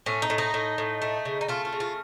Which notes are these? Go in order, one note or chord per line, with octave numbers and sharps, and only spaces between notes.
A2 C#4
D#4
A2
D#4
A2
A2
A3
C#3
D#4
A3 F4
F4
C#3
F4